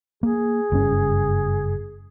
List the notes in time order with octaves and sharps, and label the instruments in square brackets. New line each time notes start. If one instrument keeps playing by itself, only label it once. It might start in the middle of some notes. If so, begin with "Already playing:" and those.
[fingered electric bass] A#3 [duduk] G#4
[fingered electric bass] F#1 G2 C#4